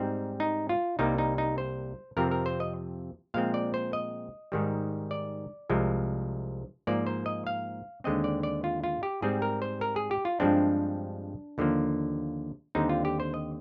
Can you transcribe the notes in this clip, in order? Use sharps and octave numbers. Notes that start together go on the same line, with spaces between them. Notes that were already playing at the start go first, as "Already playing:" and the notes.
Already playing: G#2 G3 C4 D#4
D#4
F4
C2 C3 G3 A#3 D#4
D#4
D#4
C5
F2 C3 F3 C4 A#4
A#4
C5
D#5
A#2 F3 G#3 C4 F5
D5
C5
D#5
G#2 D#3 G3
D5
C2 C3 F3 G#3
G#2 F3 A#3 D5
C5
D#5
F5
D#2 D3 G#3 C4 D#5
D5
D5
F4
F4
G4
G#2 G3 C4 G#4
A#4
C5
A#4
G#4
G4
F4
G2 F3 G#3 C4 D4
D#2 D3 F3 A#3
D#2 D3 G3 C4 D#4
F4
G4
C5
D#5